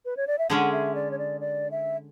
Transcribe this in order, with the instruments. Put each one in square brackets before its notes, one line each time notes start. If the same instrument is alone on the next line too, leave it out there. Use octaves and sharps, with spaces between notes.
[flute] B4
C#5
D5
E5
[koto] D3 G#3 C#4 G#4 [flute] F#5
[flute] E5
D5
C#5
D5
D5
E5